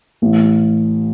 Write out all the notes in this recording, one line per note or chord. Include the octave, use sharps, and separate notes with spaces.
A1